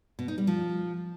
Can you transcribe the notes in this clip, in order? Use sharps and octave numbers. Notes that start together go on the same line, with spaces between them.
B2
D#4
G3
F3